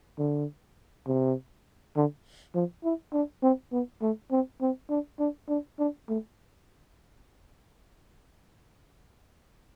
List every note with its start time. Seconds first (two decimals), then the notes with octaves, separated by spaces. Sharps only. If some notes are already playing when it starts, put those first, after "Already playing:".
0.18 D3
1.07 C3
1.96 D3
2.55 F3
2.84 E4
3.13 D4
3.43 C4
3.72 B3
4.02 A3
4.31 C4
4.61 C4
4.90 D4
5.19 D4
5.49 D4
5.79 D4
6.08 A3